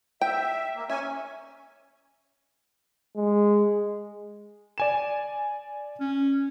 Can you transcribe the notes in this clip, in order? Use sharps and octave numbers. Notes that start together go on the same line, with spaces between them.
E5 G5
A#3
C#4 E5 G#5
G#3
D5 G#5 E7
C#4